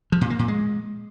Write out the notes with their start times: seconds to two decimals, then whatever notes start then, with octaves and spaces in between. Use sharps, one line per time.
0.12 F3
0.21 A#2
0.30 A#3
0.39 A#2
0.48 G#3